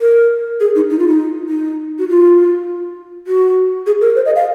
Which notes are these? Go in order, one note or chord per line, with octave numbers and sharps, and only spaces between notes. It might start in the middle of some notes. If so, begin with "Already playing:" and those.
A#4
G#4
D#4
D#4
F4
D#4
D#4
F#4
F4
F#4
G#4
A#4
C5
D#5
F5